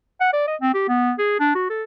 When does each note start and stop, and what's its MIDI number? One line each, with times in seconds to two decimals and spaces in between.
0.21 0.31 78
0.33 0.47 74
0.48 0.56 75
0.61 0.71 60
0.74 0.87 67
0.88 1.13 59
1.19 1.38 68
1.40 1.52 62
1.55 1.66 66
1.70 1.83 69